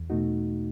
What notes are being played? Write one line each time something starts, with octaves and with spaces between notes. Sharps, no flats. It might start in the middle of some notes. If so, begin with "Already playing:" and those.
Already playing: E2
B2 A3 D#4 F#4